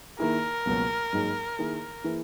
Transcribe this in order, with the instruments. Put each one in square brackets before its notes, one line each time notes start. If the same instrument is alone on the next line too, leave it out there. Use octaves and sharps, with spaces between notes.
[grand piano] D#3 A#3 E4 G#4 [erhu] A#4
[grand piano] C#2 B2 F#3 A#3
G#2 F#3 A#3 D#4 G#4
D#3 A#3 E4 G#4
E3 A#3 E4 G#4